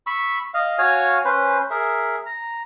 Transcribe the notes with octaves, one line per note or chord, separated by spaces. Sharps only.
B5 C#6 E6
D#5 F5
F#4 C#5 F5 G#5
C#4 B4 C5
G#4 A#4 E5
A#5